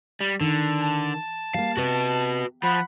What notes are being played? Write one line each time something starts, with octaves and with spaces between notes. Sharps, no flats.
G3
D3 D#3
A5
G3 A#3 F5
C3 F#4 B4
F3 F#5 B5